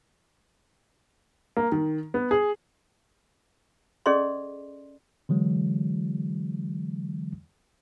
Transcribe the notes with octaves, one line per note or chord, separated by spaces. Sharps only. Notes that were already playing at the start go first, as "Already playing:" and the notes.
A#3
D#3
B3
G#4
C#4 G#4 A4 D5 D#5 C6
D3 E3 F#3 G#3